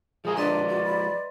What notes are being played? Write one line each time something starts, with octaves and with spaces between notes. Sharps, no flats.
F3 G#3 G#4 A#4
D4 B4 D5 D#5 C6
F#4
B5